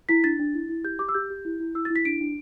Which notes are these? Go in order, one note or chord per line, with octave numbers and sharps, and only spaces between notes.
E4 B6
D4 A6
D4
E4
E4
G4 G6
G4 D6
E6
G4 G6
G4
E4
E4
E4 E6
E4 A6
B6
D4 D7
D4